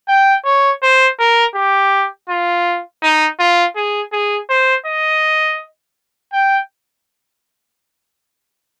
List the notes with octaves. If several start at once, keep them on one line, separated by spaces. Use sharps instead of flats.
G5
C#5
C5
A#4
G4
F4
D#4
F4
G#4
G#4
C5
D#5
G5